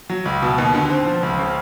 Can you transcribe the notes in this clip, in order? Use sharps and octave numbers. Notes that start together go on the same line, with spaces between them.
F#3
C#2
B2
D#2
D3
C4
F3
C#2
C#3